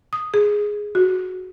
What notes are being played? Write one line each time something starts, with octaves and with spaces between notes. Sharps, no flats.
D#6
G#4
F#4